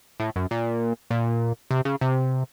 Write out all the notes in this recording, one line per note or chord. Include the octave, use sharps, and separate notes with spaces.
A2
F#2
A#2
A#2
C3
C#3
C3